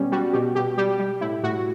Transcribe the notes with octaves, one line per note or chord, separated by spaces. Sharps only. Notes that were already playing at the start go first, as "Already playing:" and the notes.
Already playing: B2 G3 B3 C#4
G3 F#4
B2 G4
B2 G4
G3 G4
G3
A2 E4
A2 F#4